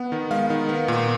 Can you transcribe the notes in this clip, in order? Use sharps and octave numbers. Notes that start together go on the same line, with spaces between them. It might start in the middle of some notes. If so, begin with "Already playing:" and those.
Already playing: B3 F#5
D#3
G#3 F5
D#3
B3
A#2